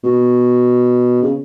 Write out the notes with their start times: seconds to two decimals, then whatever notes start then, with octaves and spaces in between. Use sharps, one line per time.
0.04 B2
1.23 C#3